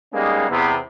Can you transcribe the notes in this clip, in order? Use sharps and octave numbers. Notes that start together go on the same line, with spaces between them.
G3 G#3 A#3 B3 C#4 D#4
E2 C3 B3